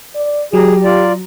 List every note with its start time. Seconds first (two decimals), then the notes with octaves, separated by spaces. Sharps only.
0.16 D5
0.53 F#3 G4 G#4 A#5
0.84 F4 D5